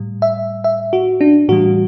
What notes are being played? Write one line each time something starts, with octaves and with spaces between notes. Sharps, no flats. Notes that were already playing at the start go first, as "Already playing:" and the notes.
Already playing: A2 G3
E5
E5
F#4
D4
A2 E3 G3 F#4